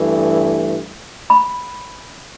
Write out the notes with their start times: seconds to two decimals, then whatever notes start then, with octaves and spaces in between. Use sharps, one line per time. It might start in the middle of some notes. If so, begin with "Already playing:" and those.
Already playing: G2 E3 A3
1.30 B5